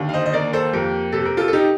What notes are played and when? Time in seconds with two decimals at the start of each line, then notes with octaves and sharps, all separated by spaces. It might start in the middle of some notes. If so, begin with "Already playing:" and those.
Already playing: D#2 D3
0.09 F5
0.13 C5 D#5
0.26 D#5
0.33 A#3 A#4 D5
0.53 A4 C5
0.73 F2 G4 A#4
1.12 C3 A4
1.25 A#4
1.37 F4 A4
1.48 A4
1.53 D#4 G4